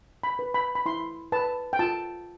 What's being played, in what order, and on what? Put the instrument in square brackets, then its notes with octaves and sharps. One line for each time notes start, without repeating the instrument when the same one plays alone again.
[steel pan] B5
B4
B5
B5
E4 C6
B4 A5
G5
F4 A5